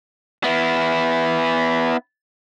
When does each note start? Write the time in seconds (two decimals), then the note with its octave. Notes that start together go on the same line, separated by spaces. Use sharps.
0.44 B3 E4